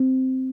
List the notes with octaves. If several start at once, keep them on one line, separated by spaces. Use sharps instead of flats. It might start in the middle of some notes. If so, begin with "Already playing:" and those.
Already playing: C4